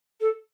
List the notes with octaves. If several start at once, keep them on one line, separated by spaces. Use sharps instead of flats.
A4